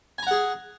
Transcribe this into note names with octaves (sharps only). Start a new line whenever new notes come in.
G#4 F#5 G#5 A#5